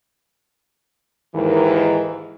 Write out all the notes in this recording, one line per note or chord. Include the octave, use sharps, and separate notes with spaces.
D#2 G#2 D#3 E3